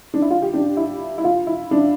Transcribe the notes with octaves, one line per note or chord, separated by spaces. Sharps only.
D4
E4
F4
G4
D4
E4
E4
F4
E4
D4